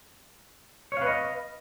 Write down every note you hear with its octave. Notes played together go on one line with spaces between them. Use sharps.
B4 C#5 D#5 F5